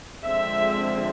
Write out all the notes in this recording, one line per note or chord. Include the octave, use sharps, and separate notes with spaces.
D3 F3 G#3 C4 E5